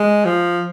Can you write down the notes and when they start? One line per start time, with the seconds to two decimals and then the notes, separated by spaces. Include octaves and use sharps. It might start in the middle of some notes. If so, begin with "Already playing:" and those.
Already playing: G#3
0.25 F3